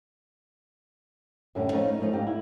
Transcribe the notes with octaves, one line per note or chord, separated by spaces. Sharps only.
F#2 A2 D3 G3 C#4
F3 A3 C#4 D#4 B4 C#5
D#4
F3 A3 B3 C#4 D#4
G#2 G4 D#5 F5
E4